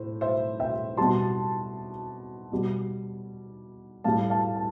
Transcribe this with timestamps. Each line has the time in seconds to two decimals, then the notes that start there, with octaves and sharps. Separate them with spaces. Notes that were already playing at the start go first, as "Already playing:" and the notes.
Already playing: A2 C5
0.21 C5 E5
0.60 E5 G5
0.97 B2 G3 A5 C6
2.52 B2 G3
4.04 A2 G3 F5 A5
4.30 F5 A5
4.56 A5